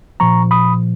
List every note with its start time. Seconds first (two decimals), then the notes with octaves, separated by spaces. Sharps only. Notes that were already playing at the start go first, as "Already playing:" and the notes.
0.20 A#2 F3 A#5 C#6
0.51 B5 D#6